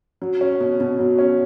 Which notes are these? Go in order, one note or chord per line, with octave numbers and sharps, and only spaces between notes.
F#3
C#4
B2
B2
F#3
C#4